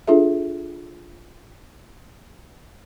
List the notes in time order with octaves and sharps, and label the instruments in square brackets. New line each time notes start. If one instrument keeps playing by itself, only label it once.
[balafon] D4 F4 G#4 A4 E5